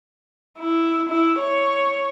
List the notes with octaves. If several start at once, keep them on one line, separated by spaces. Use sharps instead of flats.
E4
E4
C#5